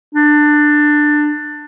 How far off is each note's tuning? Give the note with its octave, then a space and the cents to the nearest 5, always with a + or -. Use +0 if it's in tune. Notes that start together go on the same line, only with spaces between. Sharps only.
D4 +20